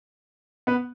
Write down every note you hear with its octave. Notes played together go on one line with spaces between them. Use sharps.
B3 B4